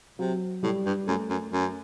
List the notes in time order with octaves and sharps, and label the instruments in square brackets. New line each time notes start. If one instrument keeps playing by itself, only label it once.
[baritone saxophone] C3 [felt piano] F#3
[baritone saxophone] A2 [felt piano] G3
[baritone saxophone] G2
[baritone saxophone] F#2 [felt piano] A3
[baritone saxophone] F#2
F#2